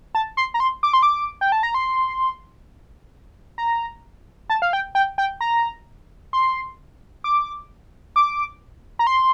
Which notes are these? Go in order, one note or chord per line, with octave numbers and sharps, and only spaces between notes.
A5
C6
A#5
C6
D6
C6
D6
G5
A5
A#5
C6
A#5
A5
F5
G5
G5
G5
A#5
C6
D6
D6
A#5
C6